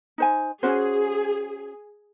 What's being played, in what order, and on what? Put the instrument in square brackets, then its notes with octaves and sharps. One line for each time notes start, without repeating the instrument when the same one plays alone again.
[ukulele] D#4 C5 G#5
[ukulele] C#4 F#4 C5 [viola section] G#4